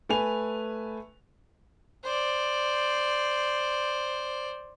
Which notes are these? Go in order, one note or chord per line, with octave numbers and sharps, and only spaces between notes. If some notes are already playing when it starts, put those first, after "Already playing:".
A3 B4 G#5 F7
C5 D5